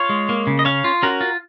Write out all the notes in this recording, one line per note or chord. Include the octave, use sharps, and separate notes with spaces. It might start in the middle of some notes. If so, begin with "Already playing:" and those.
Already playing: F4 C#5 F5
G#3
A#3
C#3
D#5
C#4 C#5 F5
F4
C#4 F#4 A#4
F4